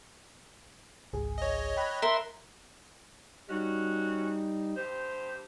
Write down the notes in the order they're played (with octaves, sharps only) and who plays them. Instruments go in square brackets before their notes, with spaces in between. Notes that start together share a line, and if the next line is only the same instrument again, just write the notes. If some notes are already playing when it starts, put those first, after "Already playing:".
[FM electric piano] G#1 C#2 G#4
[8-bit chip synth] C#5 D#5
[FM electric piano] G5 B5 F#6
[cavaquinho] A#4 [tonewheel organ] E5 C6
[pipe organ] G3 D#4 [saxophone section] C#4 F#4
[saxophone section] G2 G4 C5